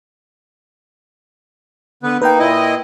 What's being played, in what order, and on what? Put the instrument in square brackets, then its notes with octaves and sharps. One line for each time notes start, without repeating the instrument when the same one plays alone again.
[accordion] D3 B3 B4
[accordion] A#3 D#4 [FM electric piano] B4 G5
[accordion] A#2 E4 D#5